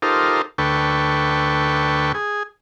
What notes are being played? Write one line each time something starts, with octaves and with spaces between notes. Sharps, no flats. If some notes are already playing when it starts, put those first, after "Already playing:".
D#4 F4 G4 A4 A#4 C5
D2 A4 B4 G5 C#6
G#4